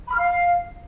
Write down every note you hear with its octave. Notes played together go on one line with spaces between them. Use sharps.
B5
F6
F5